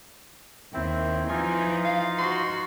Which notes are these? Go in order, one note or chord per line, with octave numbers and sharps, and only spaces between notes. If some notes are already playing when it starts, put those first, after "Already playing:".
D#2 C4 E4
E3 F3 D#4 F4 G#5
F5
F#4 C6